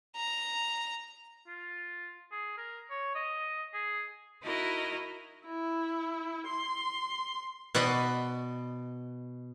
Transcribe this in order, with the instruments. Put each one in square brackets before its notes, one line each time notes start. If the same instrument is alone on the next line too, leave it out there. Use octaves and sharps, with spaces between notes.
[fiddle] A#5
[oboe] F4
G#4
A#4
C#5
D#5
G#4
[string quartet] D#4 E4 F#4 A#4 D#5
[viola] E4
C6
[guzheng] B2 B4 D5 D#5